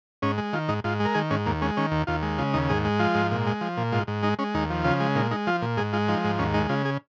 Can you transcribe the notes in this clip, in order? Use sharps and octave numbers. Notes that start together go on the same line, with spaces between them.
G#2 C#4
G#3
D#3 F4
G#2 D#4
G#2 F4
G#3
A#4
D#3 G#4
G#2 C#4
D#2 A#3
G#3 C#4
D#3 C#4
D#2
D#2 F4
G#3
C#3 F4
D#2 D#4
G#2 G#4
G#3
F3 F4
G#2
A#2
G#3
F3
A#2
G#2 F4
G#2
G#3 D#4
G#3 C#4
D#2 D#4
F3
C#3 F4
G#3
A#2 D#4
G#3 D#4
F3 F4
A#2
G#2 G#4
G#3 F4
F3 D#4
G#2
D#2 C#4
G#3 D#4
C#3 F4
G#4